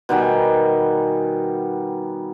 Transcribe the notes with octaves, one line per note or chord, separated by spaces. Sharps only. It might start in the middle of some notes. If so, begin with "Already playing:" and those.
B2 D#3 G3 G#5